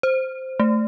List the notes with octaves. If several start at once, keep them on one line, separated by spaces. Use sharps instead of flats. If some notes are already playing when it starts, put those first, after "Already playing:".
C5
A3